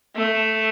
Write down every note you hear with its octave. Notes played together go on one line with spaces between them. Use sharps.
A3